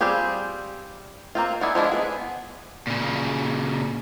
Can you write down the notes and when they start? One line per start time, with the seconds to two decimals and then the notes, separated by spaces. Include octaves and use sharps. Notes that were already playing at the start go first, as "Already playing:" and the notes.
0.01 G3 C4 F4 G4 G#4
1.35 A#3 C4 F4
1.61 E4 G#4 D5 F#5
1.75 F3 G#3 D4 E4
1.92 B3 G#4
2.87 A#2 C#3